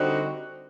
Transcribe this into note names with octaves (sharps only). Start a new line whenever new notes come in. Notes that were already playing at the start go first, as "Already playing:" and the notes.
Already playing: D3 G3 C4 D#4 F#4